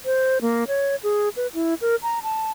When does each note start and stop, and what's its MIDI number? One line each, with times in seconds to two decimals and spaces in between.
0.05 0.39 72
0.42 0.64 58
0.68 0.96 73
1.03 1.29 68
1.36 1.47 71
1.54 1.74 64
1.81 1.96 70
2.03 2.19 82
2.23 2.51 81